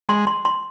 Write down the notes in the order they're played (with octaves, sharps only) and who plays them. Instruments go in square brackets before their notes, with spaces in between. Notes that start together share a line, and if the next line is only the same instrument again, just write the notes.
[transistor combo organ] G#3 [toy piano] C6
[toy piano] C6
C6